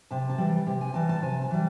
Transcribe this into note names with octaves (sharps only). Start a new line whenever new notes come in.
C3 A5
A5
E3 G3
C3
G#5
E3 G3 A5
A5
C3 G#5
A5
E3 G3